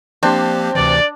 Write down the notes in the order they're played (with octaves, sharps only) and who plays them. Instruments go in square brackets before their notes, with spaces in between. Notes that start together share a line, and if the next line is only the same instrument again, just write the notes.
[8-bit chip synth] F3 A#3 G4 [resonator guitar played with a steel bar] C4 [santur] D4
[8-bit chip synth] D2 C3 E3 [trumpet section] D5